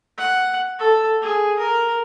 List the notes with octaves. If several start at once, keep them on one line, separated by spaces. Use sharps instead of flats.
F#5
A4
G#4
A#4